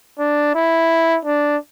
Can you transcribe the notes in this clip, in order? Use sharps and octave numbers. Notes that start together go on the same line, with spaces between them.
D4
E4
D4